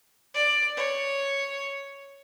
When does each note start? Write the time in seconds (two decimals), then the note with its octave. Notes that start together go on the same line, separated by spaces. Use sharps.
0.34 D5
0.77 C#5